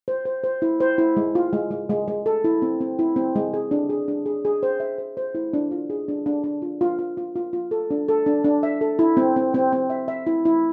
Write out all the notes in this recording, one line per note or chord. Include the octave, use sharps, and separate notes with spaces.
C5
C5
C5
E4
C5
E4
G#3
F4
G#3
G#3
G#3
G#3
A4
E4
C4
C4
E4
C4
G#3
G#4
D4
G#4
D4
G#4
G#4
C5
E5
C5
C5
E4
D4
F4
G#4
D4
D4
D4
F4
F4
F4
F4
F4
F4
A4
D4
A4
D4
D4
E5
A4
E4
C4
C4
C4
C4
E5
E5
E4
E4